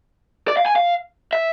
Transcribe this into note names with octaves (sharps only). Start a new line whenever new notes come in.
D5
F5
G#5
F5
E5